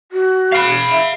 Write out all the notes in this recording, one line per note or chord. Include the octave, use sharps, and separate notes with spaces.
F#4
F5 B5
E5